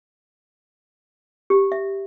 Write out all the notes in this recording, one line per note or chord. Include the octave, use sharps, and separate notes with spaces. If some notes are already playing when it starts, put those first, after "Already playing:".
G4
E5